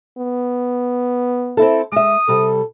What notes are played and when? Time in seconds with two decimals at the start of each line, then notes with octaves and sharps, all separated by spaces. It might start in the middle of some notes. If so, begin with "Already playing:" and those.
0.18 B3
1.57 C4 E4 A4
1.92 G#3 E5 D#6
2.28 C3 G3 A4